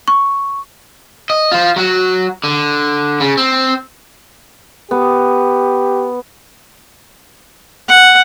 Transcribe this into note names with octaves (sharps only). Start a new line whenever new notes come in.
C#6
D#5
F4 C5
F#3 F#4
D3
C#3
C4
B3 G4
F#5